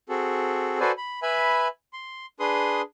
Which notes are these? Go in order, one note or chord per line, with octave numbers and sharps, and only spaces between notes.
C4 F#4 G#4 A4
F#4 A4 B4 C5 D5 G#5
B5
B4 E5 G#5 B5
C6
D4 G#4 B4 C6 D#6